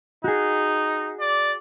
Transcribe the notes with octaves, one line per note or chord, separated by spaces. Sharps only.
D#4 F#4 G#4
D5